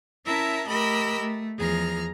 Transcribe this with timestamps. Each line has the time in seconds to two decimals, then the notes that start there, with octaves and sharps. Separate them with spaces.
0.25 C#4 E4 A#4 E5 A5 A#5
0.67 A3 G4 A#4 D#5 B5 E6
1.19 A3
1.58 E2 F3 G#4 A#5 F6